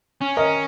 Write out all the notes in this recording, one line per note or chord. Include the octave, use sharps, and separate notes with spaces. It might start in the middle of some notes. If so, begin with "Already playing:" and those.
C#4
A#4 D#5